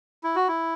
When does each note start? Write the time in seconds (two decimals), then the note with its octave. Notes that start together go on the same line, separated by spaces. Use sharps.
0.24 E4
0.36 F#4
0.48 E4